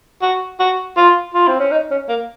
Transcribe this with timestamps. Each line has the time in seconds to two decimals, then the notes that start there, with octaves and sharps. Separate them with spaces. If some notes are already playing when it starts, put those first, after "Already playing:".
0.22 F#4
0.59 F#4
0.97 F4
1.34 F4
1.47 C4
1.60 C#4
1.71 D#4
1.91 C#4
2.09 A#3